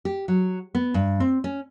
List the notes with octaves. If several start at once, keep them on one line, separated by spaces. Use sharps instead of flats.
G4
F#3
B3
G2
C4
C#4